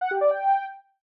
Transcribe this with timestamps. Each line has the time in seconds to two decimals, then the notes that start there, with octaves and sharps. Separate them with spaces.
0.01 F#5
0.11 G4
0.21 D5
0.31 G5